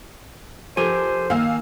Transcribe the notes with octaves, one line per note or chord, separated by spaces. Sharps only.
F3 G4 A4 A#4 C5 G#5
D#3 A#3 F5 G#5 E6